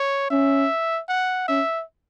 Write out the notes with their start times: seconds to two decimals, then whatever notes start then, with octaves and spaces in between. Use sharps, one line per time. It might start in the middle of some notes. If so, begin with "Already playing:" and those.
Already playing: C#5
0.30 C#4 E5
1.09 F#5
1.48 C#4 E5